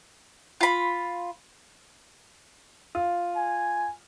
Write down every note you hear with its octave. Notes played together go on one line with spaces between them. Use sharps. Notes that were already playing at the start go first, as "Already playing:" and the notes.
F4 B5
F4
G#5